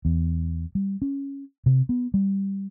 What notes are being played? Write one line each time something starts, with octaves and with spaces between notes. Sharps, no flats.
E2
G3
C#4
C3
B3
G3